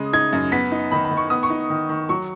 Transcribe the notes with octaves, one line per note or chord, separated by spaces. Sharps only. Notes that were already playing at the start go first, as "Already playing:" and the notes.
Already playing: C#3 G#3 D#6
D#4 G#6
F#2
B3 B6
D#4
D#3 B5
B5
D#3
C#6
B3 D#6
C#6
D#4
D#3
D#3
F#3 C#6